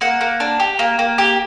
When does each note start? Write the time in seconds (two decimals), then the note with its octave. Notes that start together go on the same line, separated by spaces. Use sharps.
0.01 A#3 F#5
0.21 A#3
0.40 D4
0.60 G4
0.79 A#3
0.99 A#3
1.18 G4